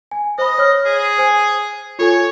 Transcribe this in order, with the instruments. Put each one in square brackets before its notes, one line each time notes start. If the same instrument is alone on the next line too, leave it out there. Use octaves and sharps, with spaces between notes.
[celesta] G#5
[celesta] C5 B5 [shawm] D#5
[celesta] C#5 F6
[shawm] G#4
[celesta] C5 G#5
[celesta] F4 A4 G#5 [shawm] C#5